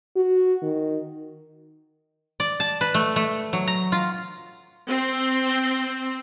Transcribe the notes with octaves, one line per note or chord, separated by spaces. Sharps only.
F#4
D#3
D5
A5
B4
A3
A3
F#3
A#5
F4
C4